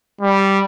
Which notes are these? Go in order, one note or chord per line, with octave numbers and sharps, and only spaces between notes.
G3